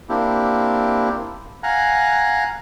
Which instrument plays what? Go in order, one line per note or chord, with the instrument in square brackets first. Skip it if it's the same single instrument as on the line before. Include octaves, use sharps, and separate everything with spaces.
[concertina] A#3 C4 D4 E4 G4
F5 F#5 G#5 A#5 F#6